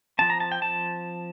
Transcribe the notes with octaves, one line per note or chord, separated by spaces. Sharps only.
F3 C4 A5
A#5
A5
G5
A5